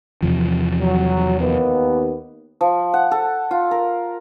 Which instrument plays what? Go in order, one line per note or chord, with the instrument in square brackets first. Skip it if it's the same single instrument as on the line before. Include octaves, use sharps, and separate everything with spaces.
[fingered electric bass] E2 C3 F3
[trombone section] F#3
D#2 B3
[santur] F3
F#5
A4
F4
A#4